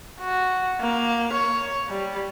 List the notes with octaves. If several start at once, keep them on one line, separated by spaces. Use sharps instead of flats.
F#4
A#3
C#5
G3